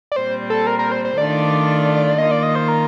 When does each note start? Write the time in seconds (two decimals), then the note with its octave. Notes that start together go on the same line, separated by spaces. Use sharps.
0.12 D5
0.16 A#2 G3 C4 C5
0.50 A4
0.67 A#4
0.79 A#4
0.92 C5
1.05 C5
1.17 D#3 A3 D4 F4 D5
2.18 D#3 A#3 F4 D#5
2.31 D5
2.43 D#5
2.55 C5
2.68 A#4